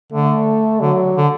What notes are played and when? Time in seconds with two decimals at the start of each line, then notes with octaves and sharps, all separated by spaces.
0.13 D3 A3
0.81 D3 F#3
1.17 D3